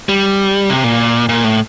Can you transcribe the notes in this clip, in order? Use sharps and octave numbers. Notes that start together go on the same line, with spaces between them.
G3
C3
A#2
A#2
A2